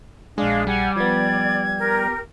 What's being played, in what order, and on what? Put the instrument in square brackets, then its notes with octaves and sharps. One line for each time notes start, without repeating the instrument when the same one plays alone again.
[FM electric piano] A#1 G#4 [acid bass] G#3 [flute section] D4 F5
[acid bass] G3 [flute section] F#5 [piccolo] G#5
[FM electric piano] F3 B3 [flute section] D5 [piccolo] G#6
[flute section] G4 A#4